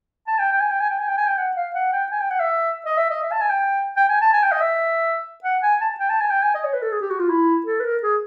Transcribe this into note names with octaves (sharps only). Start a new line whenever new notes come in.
A5
G5
G5
G#5
G5
G#5
G5
G#5
G5
G#5
G5
F#5
F5
F#5
G5
G#5
G5
F#5
E5
D#5
E5
D#5
E5
A5
G#5
G5
G5
G#5
A5
G#5
G5
D#5
E5
F#5
G#5
A5
G5
A5
G#5
G5
G#5
D#5
C#5
B4
A4
G#4
G4
F#4
F4
E4
A4
B4
A#4
G#4